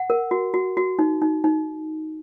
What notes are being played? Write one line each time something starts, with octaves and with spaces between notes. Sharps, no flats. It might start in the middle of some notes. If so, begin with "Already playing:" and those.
Already playing: F#5
A#4
F#4
F#4
F#4
D#4
D#4
D#4